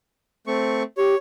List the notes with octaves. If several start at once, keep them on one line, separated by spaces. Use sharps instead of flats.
A3 C4 C#6
G4 C#5